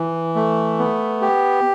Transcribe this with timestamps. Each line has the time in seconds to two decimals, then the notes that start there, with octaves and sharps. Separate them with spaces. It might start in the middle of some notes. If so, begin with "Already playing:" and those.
Already playing: E3
0.35 A3
0.79 B3
1.21 G4